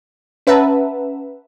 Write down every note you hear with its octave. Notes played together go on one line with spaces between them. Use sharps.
C#4 B4 E5 F#5 A5 A#5